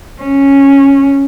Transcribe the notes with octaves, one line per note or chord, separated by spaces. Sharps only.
C#4